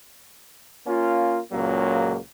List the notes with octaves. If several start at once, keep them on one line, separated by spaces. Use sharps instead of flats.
A#3 C#4 F4
C#2 A#2 C#3 F#3 A#3